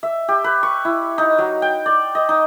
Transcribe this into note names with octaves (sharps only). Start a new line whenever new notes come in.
E5
G4
B4
C#6
E4
D#4
F#3
G5
D5
D#5
D#4